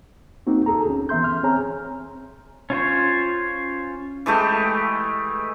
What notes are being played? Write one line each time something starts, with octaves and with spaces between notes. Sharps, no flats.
A#3 C4 D#4 F#4
D2 G#4 A4 A#5
C#4
E3 B3 E5 C6 G6
F6
C4 G#4 C#5 G#5 A#5
C#4 F4 C5 C#5
E3 G#3 A3 G4